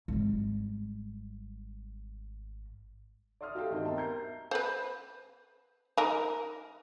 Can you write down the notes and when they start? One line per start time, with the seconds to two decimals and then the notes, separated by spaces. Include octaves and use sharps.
0.08 G#1 G3
3.41 D5 E5 C6 D#6 F6
3.55 F#4 G4 A4 E5 F5 G5
3.70 G#1 G2 D#3 G3 D#5 C6
3.84 B3 C4 A#4 E5 G5 A5
3.97 A#5 G6 C7
4.51 B4 C5
5.98 D#4 A#4